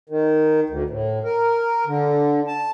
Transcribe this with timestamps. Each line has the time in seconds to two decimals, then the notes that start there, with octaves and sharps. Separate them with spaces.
0.09 D#3
0.70 D2
0.90 A2
1.24 A#4
1.87 D3
2.48 A5